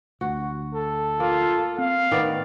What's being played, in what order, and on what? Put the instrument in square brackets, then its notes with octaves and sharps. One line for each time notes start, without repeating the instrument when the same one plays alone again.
[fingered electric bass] D2 [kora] F#4
[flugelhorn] A4
[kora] A#3 [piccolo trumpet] F4
[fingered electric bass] C4 [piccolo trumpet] F5
[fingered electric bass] A2 [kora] D#3 B3 D5